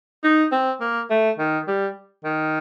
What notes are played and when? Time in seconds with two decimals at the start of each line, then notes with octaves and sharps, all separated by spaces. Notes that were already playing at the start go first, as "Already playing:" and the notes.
0.24 D#4
0.52 C4
0.81 A#3
1.10 A3
1.39 D#3
1.68 G3
2.25 D#3